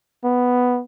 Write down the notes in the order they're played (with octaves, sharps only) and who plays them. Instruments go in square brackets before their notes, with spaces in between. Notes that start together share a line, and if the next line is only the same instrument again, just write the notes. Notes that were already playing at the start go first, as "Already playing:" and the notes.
[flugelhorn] B3